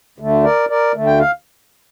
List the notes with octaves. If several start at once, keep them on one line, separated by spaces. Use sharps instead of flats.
D2 D3 A3
A#4 D5
A#4 D5
D2 D3 A3
G5
F5